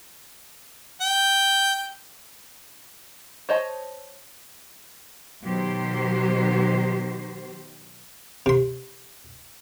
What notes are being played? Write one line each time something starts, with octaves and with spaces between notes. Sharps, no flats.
G5
C5 C#5 D#5 A5
B2 D#3 F#3 G4 C5
C3 C6